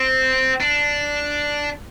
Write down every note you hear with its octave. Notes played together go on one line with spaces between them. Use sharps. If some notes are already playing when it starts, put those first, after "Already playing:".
Already playing: C4
D4